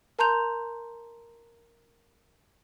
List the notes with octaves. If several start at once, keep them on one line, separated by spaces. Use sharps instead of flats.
A#4 A5 A#5 C6 G6 F7